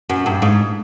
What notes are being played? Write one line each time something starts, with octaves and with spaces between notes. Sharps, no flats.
F#2
G2
G#2